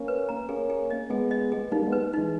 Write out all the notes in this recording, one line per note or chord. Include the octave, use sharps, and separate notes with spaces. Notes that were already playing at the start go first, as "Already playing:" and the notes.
Already playing: A#3 C#4
B4
A#5
A#3 C#4 G#4
G#4
D#5
G#3 B3 G#4
D#5
G#4
G3 A#3 D#4
G#3 B3
B4
E3 G#3 D#4